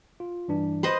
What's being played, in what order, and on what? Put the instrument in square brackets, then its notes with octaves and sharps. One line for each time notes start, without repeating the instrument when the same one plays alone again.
[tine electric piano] F4
G2 E3 D4
[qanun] B4 C5 D#5